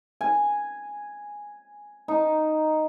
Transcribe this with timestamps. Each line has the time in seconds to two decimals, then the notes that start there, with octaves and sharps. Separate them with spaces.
0.21 G#5
2.08 D#4